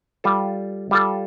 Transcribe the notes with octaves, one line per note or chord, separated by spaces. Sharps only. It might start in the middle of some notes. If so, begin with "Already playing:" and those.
G3 F4 A4
G3 F4 A4